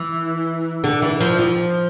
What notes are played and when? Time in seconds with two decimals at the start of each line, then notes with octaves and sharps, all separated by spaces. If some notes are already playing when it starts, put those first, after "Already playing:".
Already playing: E3
0.84 D3
1.02 E3
1.21 F3
1.39 F3